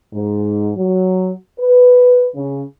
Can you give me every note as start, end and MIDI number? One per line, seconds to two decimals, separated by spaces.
0.14 0.71 44
0.76 1.31 54
1.58 2.25 71
2.35 2.61 49